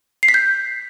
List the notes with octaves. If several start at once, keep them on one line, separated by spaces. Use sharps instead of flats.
C7
B6
G6